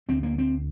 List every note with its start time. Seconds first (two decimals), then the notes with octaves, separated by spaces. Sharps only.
0.09 D2 D3 C4
0.23 A#3
0.38 C4